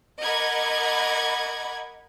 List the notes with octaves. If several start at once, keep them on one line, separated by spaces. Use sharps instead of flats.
A#4 D#5 F#5 B5 D6 G#6